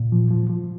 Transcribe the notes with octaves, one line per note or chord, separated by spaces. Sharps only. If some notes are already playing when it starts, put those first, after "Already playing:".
Already playing: A#2
F3
F3
F3